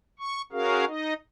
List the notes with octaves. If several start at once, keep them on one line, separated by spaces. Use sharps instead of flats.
C#6
C#4 F#4 G#4 A#4 F5
D#4 D#5